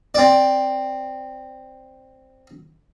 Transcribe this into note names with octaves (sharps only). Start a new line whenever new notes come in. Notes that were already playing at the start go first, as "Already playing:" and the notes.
C4 D5